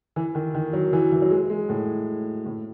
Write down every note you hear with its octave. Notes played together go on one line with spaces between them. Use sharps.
E3
D#3
D#3
F#3
E3
E3
F#3
G#3
G#3
A2
A2